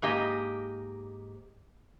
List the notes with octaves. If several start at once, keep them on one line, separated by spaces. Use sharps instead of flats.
G#2 A#3 G4 D#5